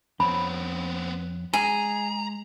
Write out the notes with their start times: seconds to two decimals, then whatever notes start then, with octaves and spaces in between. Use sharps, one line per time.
0.20 F2 B3 C4 C#5 B5
1.54 G#3 G#4 A#5